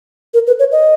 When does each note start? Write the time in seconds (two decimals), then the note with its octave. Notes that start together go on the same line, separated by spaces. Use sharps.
0.34 A#4
0.47 B4
0.59 C#5
0.72 D#5